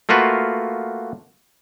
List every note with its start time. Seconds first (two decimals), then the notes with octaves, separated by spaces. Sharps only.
0.09 A3 A#3 F4 F#4 B4